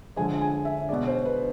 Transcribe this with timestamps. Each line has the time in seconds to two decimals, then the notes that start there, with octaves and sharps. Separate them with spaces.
0.16 D3 F3 G#3 G#5
0.41 G#5
0.65 E5
0.89 B2 G#3 D5
1.07 C5
1.25 B4